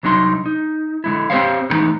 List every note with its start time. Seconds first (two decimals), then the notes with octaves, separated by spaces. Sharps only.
0.03 C2 F#3 D4 D#4 C6
0.46 D#4
1.04 D3 G#3 E4
1.30 C4 G4 G#4 C5 C#5 F5
1.70 D3 E3 G#3 A3 D#4